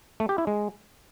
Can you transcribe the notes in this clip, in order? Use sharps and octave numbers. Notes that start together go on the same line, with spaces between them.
A3
G4
E4
G#3